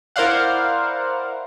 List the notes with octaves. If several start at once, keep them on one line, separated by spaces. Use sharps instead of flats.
E4 A#4 C5 D5 F5 F#5